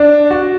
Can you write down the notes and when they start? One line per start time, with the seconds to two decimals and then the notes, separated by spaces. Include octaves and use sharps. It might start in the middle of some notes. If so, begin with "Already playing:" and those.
Already playing: D4
0.31 F#4